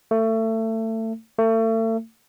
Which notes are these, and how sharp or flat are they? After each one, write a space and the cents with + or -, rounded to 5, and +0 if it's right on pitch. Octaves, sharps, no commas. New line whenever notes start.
A3 +25
A3 +35